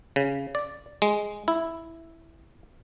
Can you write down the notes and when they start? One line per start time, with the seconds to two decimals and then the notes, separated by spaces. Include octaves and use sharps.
0.16 C#3
0.55 D5
1.02 G#3
1.48 E4